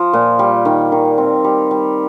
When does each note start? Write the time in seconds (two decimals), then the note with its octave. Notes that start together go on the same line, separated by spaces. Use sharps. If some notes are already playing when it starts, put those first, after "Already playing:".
Already playing: F3
0.13 A#2
0.39 G3
0.65 D#3
0.92 D#3
1.18 C4
1.44 G3
1.71 G3